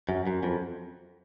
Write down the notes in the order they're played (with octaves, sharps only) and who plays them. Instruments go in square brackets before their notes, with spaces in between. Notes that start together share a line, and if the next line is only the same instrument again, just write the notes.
[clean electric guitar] F#2
F#2
F2